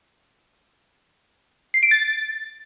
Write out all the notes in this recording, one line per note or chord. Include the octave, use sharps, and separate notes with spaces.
C7
D7
A6